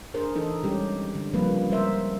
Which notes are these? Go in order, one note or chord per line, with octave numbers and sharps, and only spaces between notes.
D4 G#4 A#4 C5
E3 D#4 A4
C3 G3 G#3 C#4 G4
D3
C#3 F3 G3 A#3 C4 B4
G3 G#3 A#4 C5 E5